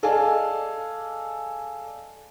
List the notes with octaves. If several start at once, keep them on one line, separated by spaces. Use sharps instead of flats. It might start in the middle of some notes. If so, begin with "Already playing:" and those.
G#4 A4 D5 D#5 F5 G#5